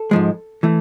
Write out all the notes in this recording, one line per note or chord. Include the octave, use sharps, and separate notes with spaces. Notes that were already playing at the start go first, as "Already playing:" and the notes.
Already playing: A4
G#2 F3 G#3
E3 A3